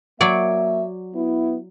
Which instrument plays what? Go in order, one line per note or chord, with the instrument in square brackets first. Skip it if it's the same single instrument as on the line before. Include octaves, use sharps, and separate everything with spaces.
[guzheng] F#3 C#5 D5 [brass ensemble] A#3 E5
[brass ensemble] B3 E4